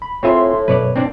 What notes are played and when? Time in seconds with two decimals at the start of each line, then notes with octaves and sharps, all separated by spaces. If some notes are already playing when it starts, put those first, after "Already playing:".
0.02 B5
0.23 A2 C4 F4 G#4 C#5 E5 C6
0.68 F#2 B2 B4 C#5 D5
0.96 C4 D4 D5